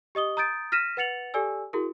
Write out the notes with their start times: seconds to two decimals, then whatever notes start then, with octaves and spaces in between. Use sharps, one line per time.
0.15 G4 D#5 D#6 G7
0.37 A#5 D#6 G6 A6 D7
0.72 F6 A#6 B6 D#7 E7
0.97 B4 F#5 A6 C#7 F7 F#7
1.34 G4 A4 D5 G#5 E6
1.73 E4 F#4 G#4 A#4